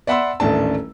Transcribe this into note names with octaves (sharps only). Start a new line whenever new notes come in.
D5 E5 F#5 B5 C6 E6
D#1 A1 A3 D4 A5